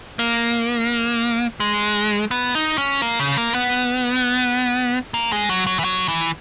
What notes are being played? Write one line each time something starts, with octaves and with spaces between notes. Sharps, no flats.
A#3
G#3
B3
D#4
C#4
A#3
C#3
A#3
B3
A#3
G#3
F#3
F#3
E3
F#3
E3